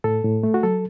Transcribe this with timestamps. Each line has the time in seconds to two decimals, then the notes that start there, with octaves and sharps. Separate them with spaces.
0.04 A2 A4
0.24 A2
0.43 A3
0.54 F#4
0.63 F#3 A4